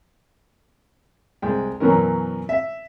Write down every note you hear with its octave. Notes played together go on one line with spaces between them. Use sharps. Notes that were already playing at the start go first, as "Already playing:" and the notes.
C2 G#3 G5
F#2 B2 E3 C#4 A#4
E5